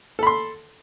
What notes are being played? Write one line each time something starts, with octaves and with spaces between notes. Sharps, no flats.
A4 B5 C6